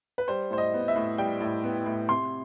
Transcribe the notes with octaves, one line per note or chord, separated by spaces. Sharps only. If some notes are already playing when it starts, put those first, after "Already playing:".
B4
G3 C5
A2 C5
D#5
B3
E5
A2
G3 G5
A2
B3
A2
C3 C6